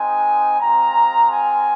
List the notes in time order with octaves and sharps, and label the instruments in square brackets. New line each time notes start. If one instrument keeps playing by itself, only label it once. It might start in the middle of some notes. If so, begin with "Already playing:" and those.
Already playing: [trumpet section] G#3 C4 D#4 G#5
G#3 C4 F4 A#5
G#5